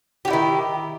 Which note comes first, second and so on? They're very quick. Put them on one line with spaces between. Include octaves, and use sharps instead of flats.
G4 F#4 E4 D#3